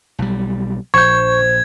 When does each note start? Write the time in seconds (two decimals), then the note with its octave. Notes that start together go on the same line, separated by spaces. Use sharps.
0.19 B1 G3
0.94 A#1 C5 C#6 G6 G#6